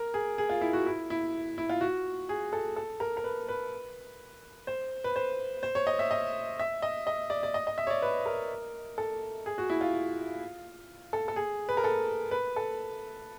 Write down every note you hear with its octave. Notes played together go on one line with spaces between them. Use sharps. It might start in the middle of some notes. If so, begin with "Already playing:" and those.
Already playing: A#4
G#4
G#4
F4
E4
F#4
E4
E4
E4
F4
F#4
G#4
A4
A4
A#4
A#4
B4
B4
C5
B4
C5
C5
C#5
D#5
E5
D#5
E5
D#5
D#5
D5
D5
D#5
D#5
E5
C#5
D5
B4
A#4
A4
G#4
F#4
E4
F4
A4
A4
G#4
B4
A#4
A4
B4
A4